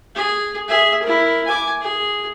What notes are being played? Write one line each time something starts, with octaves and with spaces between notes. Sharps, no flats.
G#4
G#4 E5
E4 A#4
G#5 D6
G#4